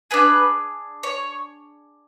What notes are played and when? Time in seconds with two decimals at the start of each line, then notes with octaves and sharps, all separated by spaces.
0.11 D4 G#4 B4
1.03 C#5